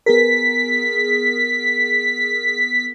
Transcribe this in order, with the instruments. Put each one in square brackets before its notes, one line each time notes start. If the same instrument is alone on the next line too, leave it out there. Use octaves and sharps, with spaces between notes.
[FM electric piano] B3 G#4 A#4 [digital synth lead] B6